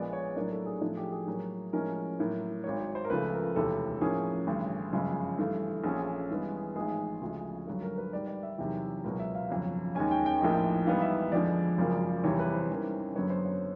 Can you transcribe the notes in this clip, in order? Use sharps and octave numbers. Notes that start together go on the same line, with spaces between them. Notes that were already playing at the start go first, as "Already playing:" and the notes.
Already playing: A#1 A#2 F3 G#3 B3 D5
C#5
A2 F#3 A#3 D4 A#4
A4
G#4
A2 F3 A3 D4 G#4
G4
G#4
A2 F#3 A#3
A2 F3 G#3 C#4 A#4
A2 F#3 A#3
G#1 G#2 D#3 C#5
C#5
C5
A#4
C#2 C#3 F3 A3 B4
A#4
E1 D2 C3 E3 A4
A2 F3 A#3 C#4 G#4
A1 G2 D3
G1 F#2 C#3 F3 G#3
G2 E3 A3
A#1 A#2 F3 A3 C#4 G#4
G2 E3 G#3 B3
A1 G#2 F3 G#3 G#4
D2 C#3 F3 G#3
G#1 G2 D3 F#3 A4
A#4
B4
G#2 D#3 G3 D5
D5
E5
E2 C3 D#3 F#3
C#2 B2 F#3 A#4
E5
F5
G1 F2 C#3 F#3
D#2 D#3 G#3 C#4 G#5
G5
G5
A#1 A2 F3 A#3 D#4
G#2 E3 G3 B3 D#4 F5
E5
F2 D3 F3 G#3 D5
G#1 F#2 C#3 F3 A#3
E2 C3 E3 G3 C#5
B4
C5
G#2 E3 G3 A#3 C#4
F#1 F#2 D3 F#3 B3 C#5
C5
C#5